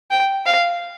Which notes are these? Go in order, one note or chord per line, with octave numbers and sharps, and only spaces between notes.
G5
F5